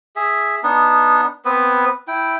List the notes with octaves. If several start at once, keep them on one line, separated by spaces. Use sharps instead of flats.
G#4 E5
B3 D4 D#4
B3 C4 B4
E4 G5